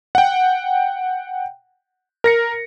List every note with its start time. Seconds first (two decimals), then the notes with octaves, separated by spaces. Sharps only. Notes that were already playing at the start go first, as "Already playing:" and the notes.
0.15 F#5 G5
2.24 A#4 A#6 C#7